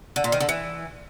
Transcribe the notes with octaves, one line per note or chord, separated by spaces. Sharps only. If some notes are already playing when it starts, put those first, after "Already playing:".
D3
A#2
D#3
D3
E3